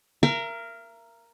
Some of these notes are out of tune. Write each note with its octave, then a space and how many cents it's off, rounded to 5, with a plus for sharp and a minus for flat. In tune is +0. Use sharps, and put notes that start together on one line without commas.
A#4 +0 E5 +45